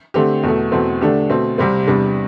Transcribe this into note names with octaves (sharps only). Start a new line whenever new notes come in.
D3 A3 C4 G4
E2 B2 A3
E2 B2 A3 C4
D3 A3 D4 G4
B2 A3 C4
C2 C3 G3 C4
E2 C3 G3 D4